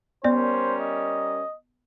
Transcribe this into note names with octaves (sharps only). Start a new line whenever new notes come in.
G3 B3 C#4 A#4 C5 D5
D#5